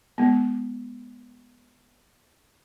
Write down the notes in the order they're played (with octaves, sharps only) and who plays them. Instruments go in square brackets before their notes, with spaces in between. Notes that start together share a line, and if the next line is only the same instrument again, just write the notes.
[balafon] G#3 B3